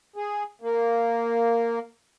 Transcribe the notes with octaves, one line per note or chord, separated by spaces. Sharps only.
G#4
A#3